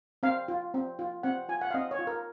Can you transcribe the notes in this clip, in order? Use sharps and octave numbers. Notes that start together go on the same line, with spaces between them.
C4 F5
F4
C4
F4
C4 F#5
F4 G#5
F#5
F5
C4 D#5
C#5
F4
A#4